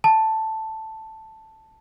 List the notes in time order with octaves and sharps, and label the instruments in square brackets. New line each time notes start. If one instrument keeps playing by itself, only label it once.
[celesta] A5